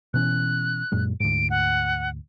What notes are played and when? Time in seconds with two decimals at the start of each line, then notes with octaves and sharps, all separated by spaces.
0.14 B2 E3 C#4 F#6
0.92 F#2 A#2 G#3
1.20 D2 G#2 D7
1.50 F#5